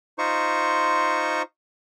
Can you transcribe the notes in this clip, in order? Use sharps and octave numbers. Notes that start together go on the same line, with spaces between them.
D#4 F4 C5 C#6